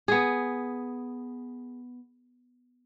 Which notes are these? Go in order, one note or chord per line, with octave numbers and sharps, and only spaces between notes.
B3 G#4